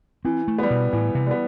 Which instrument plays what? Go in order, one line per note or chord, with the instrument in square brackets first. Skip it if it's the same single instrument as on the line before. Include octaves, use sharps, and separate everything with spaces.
[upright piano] E3 [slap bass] C4
[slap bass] A3
[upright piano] G3 B3
[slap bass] B2
[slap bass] A2 [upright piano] E3
[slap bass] C3
[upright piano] G3 B3